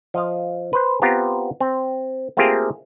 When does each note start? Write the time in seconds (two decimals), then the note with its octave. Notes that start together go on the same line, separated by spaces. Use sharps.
0.14 F3 D#5 F5
0.73 B4 C5
1.02 B3 C4 F4 G4 A#5
1.60 C4
2.37 A3 A#3 C4 F4 G4 G#4